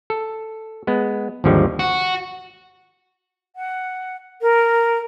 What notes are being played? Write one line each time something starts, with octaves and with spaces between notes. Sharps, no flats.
A4
G#3 B3
G#1 D#2 D3 F3 G3 D#4
F#4
F#5
A#4